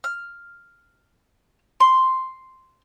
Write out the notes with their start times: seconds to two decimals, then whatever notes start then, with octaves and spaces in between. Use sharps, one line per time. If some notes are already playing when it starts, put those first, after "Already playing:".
0.04 F6
1.80 C6